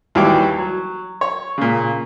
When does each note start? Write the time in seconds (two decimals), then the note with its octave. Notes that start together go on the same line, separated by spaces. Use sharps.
0.15 D#2 E3 F#3 G3 G5 D6
0.58 F#3
1.21 C#5
1.58 A#2 C#3